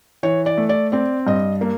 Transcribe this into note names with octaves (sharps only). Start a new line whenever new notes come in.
E3 C#5
D5
A3
D5
C4 D5
G2 D#5
A#3